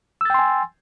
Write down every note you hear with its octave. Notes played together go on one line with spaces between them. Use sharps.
G5 G#5 C6 E6 A6